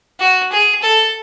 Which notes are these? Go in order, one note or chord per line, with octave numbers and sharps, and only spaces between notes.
F#4
G#4
A4